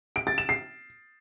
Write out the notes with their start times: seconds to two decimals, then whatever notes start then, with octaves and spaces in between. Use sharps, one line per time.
0.16 D7
0.27 A6
0.38 E7
0.49 C7